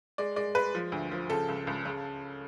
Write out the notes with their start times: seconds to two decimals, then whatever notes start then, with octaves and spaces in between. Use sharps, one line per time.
0.18 G#3 D5
0.36 G#3 D5
0.55 G#3 B4
0.75 F3
0.92 D2
1.11 F3
1.30 C#3 A4
1.48 C#2
1.67 C#2
1.85 C#3